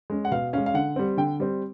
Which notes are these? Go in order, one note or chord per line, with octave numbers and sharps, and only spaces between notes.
G#3 C#4
F#5
B2 F5
G#3 C#4 F5
F5
D3 F#5
G3 C4
D3 G5
G3 C4